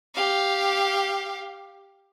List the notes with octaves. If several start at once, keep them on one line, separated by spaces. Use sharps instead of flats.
G4 F5